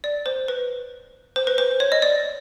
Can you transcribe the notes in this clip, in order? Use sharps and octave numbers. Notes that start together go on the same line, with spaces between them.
D5
C5
B4
C5
B4
C5
C#5
D#5
D5